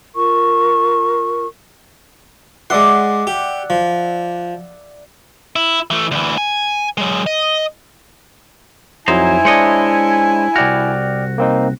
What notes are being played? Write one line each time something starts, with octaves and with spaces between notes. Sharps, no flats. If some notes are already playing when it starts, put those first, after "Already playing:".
F4 A#4 C#6
G#3 D5 E5 F#5 C6
G4
F3
E4
E3 A3
D2 E3
G#5
F#3 G#3
D#5
F2 F#3 D#4 E4 C5 G#5
G#3 D4 C5 C#5 D#5
C2 F#4 D5 G5 F6
A#3 C4 D#4